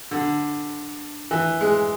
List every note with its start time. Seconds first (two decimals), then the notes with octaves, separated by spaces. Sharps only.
0.11 D3
1.31 E3
1.61 G#3